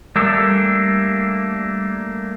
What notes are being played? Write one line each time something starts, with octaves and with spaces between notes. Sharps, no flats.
G3 A3 A#3 D4 G4 A4